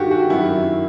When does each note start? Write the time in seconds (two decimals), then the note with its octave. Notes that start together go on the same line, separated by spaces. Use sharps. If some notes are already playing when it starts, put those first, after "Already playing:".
Already playing: G2 D#3 F#4 G4 A4
0.11 F#4
0.30 F#2 D#3 E4